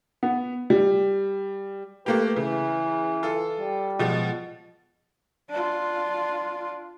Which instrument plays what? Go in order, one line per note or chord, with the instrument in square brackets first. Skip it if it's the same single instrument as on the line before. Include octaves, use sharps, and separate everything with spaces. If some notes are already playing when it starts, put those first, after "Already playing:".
[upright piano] B3
G3
[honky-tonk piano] A3 A#3 G4 [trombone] B4
[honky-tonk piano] C#3 [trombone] E3
[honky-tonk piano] F4 A4
[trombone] G3
[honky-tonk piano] B2 F3 G#3
[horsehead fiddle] D4 F4